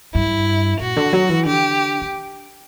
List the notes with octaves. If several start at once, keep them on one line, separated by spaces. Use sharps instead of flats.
G2 E4
A#2 F#4
D3
F#3
E3
D3 G4
D3